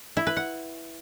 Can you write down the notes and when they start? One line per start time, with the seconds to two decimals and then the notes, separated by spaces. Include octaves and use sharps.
0.17 E4
0.27 B4
0.37 F#5